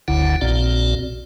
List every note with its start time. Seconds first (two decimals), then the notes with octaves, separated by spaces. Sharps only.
0.08 F#1 D2 D3 E4 F#5
0.41 A#1 A#2 C4 F#4 D5